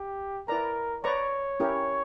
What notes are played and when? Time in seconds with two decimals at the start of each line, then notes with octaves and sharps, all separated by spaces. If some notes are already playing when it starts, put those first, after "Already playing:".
Already playing: G4
0.48 E4 A#4 B4 D5 A#5
1.04 B4 C#5 D5 A#5 C#6
1.60 C#4 E4 G4 A#4